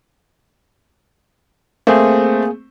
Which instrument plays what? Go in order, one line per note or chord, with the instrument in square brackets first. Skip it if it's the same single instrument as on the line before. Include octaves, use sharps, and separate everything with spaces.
[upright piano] A3 C4 [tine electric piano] A#3 G#4